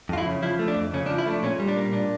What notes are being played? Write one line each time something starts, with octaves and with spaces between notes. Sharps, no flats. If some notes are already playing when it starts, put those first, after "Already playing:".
F2 F4
E4
C#3
F3 E4
A3
D4
F2
C#3 C#4
D4
F3
E4
A3 D4
A#2 C#4
G3
D4
A#3
A#2 D4